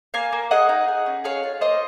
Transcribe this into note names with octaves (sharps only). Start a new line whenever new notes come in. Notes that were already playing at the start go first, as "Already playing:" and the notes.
A#3 F5 G#5
A#3
G#4 D#5 F#5
D#4
G#4
C#4
G#4 C#5 F5
F4
A#3 C5 D#5